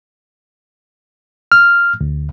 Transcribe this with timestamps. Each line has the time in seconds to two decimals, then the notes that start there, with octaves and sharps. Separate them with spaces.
1.52 F6
2.01 D2